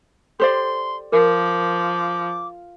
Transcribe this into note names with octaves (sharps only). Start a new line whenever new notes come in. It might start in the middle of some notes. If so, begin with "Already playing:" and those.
G4 A4 C5 D5 C6
F3 A#4 D6